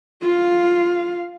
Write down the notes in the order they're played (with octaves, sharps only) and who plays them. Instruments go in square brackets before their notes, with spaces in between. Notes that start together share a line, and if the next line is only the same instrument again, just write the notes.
[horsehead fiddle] F4 F5